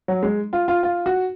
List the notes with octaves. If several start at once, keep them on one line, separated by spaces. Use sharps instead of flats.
F#3
G#3
F4
F4
F4
F#4